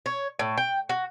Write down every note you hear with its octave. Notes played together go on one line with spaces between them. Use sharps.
C#5
A2
G5
F#4